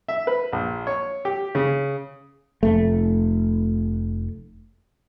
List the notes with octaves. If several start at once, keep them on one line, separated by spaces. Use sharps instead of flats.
E5
B4
A#1
C#5
G4
C#3
F1 A3